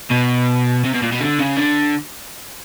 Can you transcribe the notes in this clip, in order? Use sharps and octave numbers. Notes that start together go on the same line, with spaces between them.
B2
C3
B2
A#2
B2
D3
C#3
D3